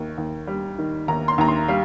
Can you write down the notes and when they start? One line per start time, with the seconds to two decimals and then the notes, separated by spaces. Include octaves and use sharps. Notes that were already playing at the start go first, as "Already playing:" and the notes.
Already playing: D#2 D#3
0.18 D#2
0.47 G3
0.78 D#3
1.08 D#2 A#5
1.28 C6
1.38 D#2 A#5
1.48 C6
1.68 G3 F5